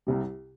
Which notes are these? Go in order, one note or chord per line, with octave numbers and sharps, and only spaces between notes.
C2 C3 G3